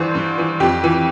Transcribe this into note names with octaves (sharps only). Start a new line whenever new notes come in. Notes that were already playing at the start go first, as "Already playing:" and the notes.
Already playing: G2 D3 E3 C5
G2
E3
F2 G4
E3